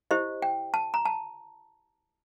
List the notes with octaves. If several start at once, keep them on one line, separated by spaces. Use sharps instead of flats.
E4 G4 C5 D#5
G5
A5
A#5
A5